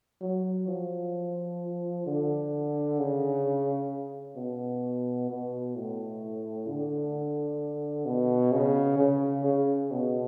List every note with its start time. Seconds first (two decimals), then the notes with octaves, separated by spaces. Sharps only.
0.21 F#3
0.68 F3
2.06 D3
2.99 C#3
4.36 B2
5.29 B2
5.75 A2
6.67 D3
8.05 B2
8.52 C#3
8.98 C#3
9.44 C#3
9.91 B2